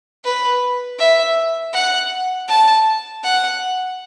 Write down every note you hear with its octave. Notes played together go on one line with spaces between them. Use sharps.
B4
E5
F#5
A5
F#5